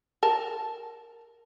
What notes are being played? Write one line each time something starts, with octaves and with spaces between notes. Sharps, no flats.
A#4 A5